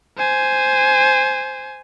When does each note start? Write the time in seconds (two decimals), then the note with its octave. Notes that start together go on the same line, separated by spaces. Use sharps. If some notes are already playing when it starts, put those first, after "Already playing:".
0.18 C5 G#5